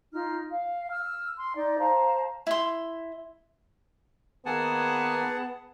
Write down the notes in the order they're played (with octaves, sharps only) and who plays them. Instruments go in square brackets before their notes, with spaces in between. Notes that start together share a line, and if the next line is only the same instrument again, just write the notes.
[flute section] D#4 F4 F6
F5
E6 F6
C6
D#4 D5
C5 F5 A5 A#5
[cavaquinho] E4 C6
[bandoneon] D#3 A#3 G#5 [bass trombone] B3 [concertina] G#4 F#5 A5